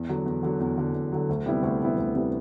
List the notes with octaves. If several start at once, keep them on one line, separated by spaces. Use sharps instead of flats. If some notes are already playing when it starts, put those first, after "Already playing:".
Already playing: E2
D3 F#3
E2
D3 F#3
E2
D3 F#3
E2
D3 F#3
D2
C3 G3 B3 E4
D2
C3 G3 B3 E4
D2
C3 G3 B3 E4